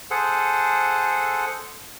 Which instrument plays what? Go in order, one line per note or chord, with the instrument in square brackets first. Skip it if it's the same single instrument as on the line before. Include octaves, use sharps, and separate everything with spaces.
[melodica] G#4 A4 C5 F#5